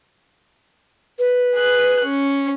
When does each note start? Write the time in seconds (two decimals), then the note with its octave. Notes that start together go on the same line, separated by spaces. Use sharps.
1.19 B4
1.55 G#4 F#6
2.04 C#4